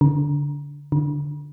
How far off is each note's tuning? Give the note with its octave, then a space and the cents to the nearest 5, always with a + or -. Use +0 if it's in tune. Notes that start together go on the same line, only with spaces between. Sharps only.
D3 -25
D3 +0